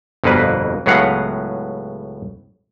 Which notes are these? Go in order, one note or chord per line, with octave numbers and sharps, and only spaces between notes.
G1 F2 B2 A#3 B4
C#2 A2 F#3 B3 F5 F#5